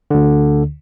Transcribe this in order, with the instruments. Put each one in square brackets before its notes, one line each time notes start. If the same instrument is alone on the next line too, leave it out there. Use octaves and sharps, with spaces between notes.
[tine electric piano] D2 D3